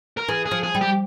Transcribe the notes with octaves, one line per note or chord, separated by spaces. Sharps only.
A#4
E3 G#4
G#4
F3
G#4
G3
G4